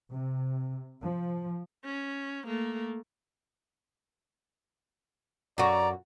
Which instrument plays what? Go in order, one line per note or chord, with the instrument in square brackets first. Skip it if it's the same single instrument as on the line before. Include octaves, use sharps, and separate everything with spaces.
[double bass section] C3
F3
[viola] C#4
A3 A#3
[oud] F#2 F#4 [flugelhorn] D5 [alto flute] A#5